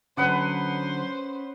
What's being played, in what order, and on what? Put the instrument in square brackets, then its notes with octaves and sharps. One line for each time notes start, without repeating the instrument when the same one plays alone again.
[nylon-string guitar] D3 F#3 [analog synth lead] C#4 [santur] B4 F#5 D#6 [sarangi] C5